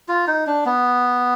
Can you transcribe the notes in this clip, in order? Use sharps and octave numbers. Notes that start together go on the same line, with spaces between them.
F4
D#4
D4
B3